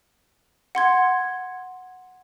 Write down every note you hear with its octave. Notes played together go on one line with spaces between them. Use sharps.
F#5 C6 G#6